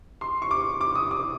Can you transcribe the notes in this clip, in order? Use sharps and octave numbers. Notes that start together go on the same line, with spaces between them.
C6
C#6
D6
D6
D#6
D6